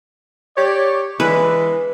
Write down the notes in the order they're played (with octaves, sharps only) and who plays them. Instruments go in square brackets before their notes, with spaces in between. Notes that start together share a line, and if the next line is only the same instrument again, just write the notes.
[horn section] G4 C#5 D5
[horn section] E3 G#3 D4 [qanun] B4